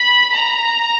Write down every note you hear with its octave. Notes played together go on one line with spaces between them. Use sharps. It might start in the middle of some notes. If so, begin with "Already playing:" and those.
Already playing: B5
A#5